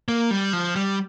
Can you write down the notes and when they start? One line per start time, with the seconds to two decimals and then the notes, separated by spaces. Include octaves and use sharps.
0.08 A#3
0.31 G3
0.53 F3
0.76 G3